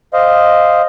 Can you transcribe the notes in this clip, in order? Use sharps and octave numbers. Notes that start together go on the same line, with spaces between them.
C5 D#5 F5